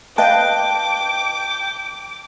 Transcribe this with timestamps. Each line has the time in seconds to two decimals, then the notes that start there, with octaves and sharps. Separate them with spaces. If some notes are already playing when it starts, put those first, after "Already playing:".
0.18 B4 D#5 F5 G5 A5 D6